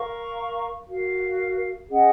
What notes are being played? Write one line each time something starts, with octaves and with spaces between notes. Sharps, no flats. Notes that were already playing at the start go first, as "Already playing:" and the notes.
Already playing: A#4 F5 A#5 C#6
F#4 A#4 F5
C#4 G#4 D#5 F#5